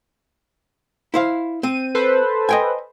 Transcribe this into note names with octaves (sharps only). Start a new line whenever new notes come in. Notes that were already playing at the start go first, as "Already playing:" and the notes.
E4 C5 F5
C4 D#7
A4 B4 C5
D#5 G5 G#5